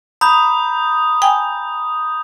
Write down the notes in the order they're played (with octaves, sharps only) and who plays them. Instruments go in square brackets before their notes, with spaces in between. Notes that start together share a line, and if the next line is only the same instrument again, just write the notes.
[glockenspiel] A#5 B5 [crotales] D#6 G6
[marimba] G5 G#5